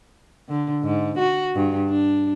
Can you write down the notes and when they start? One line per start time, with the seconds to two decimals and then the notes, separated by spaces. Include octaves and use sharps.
0.49 D3
0.84 G#2
1.19 F#4
1.55 G2
1.89 D4